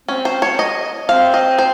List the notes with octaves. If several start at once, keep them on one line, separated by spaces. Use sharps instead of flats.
C4 C#4
C5
C#5
D#5
C4 F5
D#5
C5